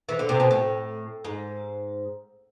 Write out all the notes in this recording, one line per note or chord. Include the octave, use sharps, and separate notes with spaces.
E3
D3
C3
B2
A2
G#2